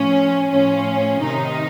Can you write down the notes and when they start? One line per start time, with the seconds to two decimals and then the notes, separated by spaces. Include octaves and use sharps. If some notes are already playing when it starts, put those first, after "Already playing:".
Already playing: A2 F3 C#4
0.50 A2 F3 C#4
1.22 C3 D#3 D#4